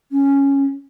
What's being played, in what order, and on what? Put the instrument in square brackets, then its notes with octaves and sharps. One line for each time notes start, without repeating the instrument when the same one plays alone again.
[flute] C#4